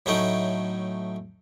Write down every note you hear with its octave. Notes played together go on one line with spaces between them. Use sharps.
A2 F#3 A3 C#4 D#4 G5